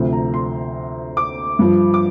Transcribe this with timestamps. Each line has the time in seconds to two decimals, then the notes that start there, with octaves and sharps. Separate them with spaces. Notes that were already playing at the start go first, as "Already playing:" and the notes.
Already playing: D2 C3 F3
0.13 A#5
0.34 C6
1.17 D6
1.59 G2 F3
1.94 D6